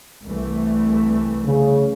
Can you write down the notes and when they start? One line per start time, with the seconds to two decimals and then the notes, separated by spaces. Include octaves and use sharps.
0.25 C2 E3 A3
1.45 C#3